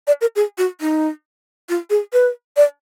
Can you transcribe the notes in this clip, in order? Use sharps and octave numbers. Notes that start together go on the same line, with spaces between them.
D5
A#4
G#4
F#4
D#4
F4
G#4
B4
D5